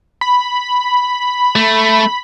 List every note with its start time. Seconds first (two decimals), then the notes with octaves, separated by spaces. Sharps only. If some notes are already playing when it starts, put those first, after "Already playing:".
0.21 B5
1.56 A3